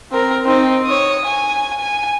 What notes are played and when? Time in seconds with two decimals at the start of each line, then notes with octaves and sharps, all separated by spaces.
0.12 C4 A#4
0.45 C4 D#4
0.85 C#5 D#6
1.25 G#5
1.80 G#5